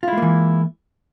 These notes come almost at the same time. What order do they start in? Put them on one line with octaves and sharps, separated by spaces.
F4 E4 G#3 A#3 E3